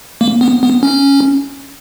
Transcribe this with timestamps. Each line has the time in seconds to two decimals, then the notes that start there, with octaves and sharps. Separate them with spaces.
0.21 A#3
0.41 B3
0.63 B3
0.83 C#4